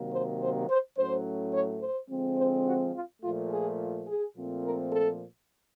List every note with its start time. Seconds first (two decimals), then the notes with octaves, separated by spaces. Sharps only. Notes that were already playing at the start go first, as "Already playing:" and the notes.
Already playing: C3 D#3 F#3 A#3
0.11 C5
0.41 C5
0.69 C5
0.96 A2 F#3 A3 C#4 C5
1.53 C#5
1.81 C5
2.09 D3 F3 G#3 C4
2.37 C5
2.66 F#4
2.93 F4
3.22 A#2 F3 A3 F4
3.50 G#4
4.07 G#4
4.34 A#2 F3 A3 C4
4.63 A#4
4.91 A4